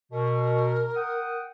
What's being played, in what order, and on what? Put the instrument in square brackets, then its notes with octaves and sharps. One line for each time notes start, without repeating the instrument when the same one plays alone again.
[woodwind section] B2 [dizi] A#4
[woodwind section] F#5 G5 D#6